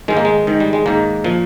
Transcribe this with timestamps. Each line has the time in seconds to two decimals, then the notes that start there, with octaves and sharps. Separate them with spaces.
0.08 G#2 D#3 G#3
0.17 A#3
0.25 G#3
0.47 G#2 D#3
0.60 G3
0.73 G#3
0.86 G#2 D#3 A#3
1.24 A#2 F3